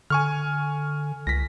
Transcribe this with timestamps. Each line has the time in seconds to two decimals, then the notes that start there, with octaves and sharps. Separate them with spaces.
0.10 D3 G#5 C#6 F6
1.27 C#2 A#6 B6